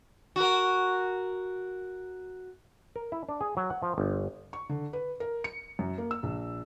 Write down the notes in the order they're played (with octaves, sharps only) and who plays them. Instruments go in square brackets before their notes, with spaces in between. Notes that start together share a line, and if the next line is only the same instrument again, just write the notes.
[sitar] F#4 A#4
[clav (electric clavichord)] A#4
E4
D4
G#4
F#3
F#5
F3
G1
[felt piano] C#6
D3
B4
A#4
C#7
F#2
A#3
E6
A#1